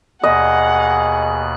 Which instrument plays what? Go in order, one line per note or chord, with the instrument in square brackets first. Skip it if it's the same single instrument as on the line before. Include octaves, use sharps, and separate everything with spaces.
[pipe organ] D#2 B2 F#6 [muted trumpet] G#4 [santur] D#5 [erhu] F#5